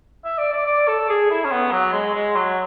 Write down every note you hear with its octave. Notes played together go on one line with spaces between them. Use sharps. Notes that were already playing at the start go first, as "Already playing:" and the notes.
E5
D5
D5
D5
A4
G#4
E4
C#4
B3
F#3
G#3
G#3
F#3